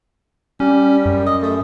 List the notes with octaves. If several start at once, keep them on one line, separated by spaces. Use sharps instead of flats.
G3 C#4
F#2
D#5
A3